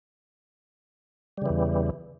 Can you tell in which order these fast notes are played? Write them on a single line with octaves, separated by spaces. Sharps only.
G3 C#3 E3 E2